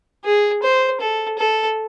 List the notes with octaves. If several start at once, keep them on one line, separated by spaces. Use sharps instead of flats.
G#4
C5
A4
A4